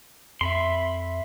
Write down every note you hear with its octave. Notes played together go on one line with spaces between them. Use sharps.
F2 E5 B5 C6